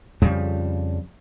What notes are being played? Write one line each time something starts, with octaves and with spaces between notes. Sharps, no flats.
F2 C#3 F3 G3